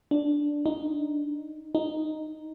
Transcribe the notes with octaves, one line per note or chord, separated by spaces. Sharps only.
D4
D#4
D#4